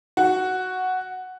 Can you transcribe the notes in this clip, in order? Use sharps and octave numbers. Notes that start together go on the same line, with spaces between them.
F#4